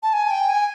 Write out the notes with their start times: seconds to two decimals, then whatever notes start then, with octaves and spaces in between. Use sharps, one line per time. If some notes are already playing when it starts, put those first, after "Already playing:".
0.03 A5
0.13 G#5
0.30 G5
0.48 G#5